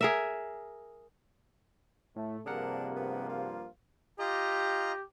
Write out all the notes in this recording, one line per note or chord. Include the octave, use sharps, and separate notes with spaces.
G#4 A#4 E5
A2 A3
G2 C3 F3 A#3 D4 G#4 A#4 F#5
B3
F4
F4 G4 D#5 A#5